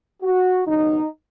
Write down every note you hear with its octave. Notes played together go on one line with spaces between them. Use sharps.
F#4
D#2 C#3 F#3 B3 D#4